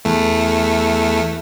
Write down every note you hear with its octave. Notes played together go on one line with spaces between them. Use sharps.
E2 A3